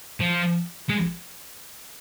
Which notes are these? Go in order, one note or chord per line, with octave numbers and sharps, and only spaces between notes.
F3
G#3